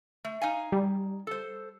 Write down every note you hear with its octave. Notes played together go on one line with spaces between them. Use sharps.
A3
D#4 F5 G#5
G3
A4 C5